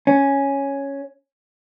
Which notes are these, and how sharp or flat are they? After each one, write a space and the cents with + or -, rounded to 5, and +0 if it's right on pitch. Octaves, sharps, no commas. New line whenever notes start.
C#4 +0